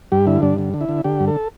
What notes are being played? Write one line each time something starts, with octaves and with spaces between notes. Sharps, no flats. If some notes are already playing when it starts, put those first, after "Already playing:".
G2 G4
D3 E4
G2 D4
D3
D3
E4
D3
D3 G4
G2
A4